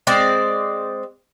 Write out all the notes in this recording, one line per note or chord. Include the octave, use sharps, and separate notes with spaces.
G#3 C4 D5